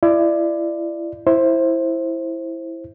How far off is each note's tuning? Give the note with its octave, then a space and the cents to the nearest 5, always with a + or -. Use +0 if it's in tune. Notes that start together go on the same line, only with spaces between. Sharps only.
E4 +30 D5 +15
E4 +0 C5 +15